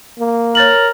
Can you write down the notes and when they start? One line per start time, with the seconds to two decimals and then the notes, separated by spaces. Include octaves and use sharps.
0.19 A#3
0.55 A#4 C#5 A6 F#7